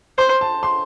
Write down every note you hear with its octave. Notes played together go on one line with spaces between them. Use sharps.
C5 C6
A5
C6